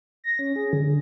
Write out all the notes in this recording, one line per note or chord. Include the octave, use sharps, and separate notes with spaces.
A#6
C#4
G#4
D3